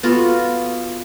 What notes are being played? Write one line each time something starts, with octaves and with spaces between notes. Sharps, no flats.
B3 F4 F#4 A4